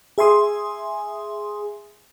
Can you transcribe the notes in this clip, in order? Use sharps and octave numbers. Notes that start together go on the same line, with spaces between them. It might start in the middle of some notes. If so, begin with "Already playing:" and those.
G#4 E5 G#5 C6 D#6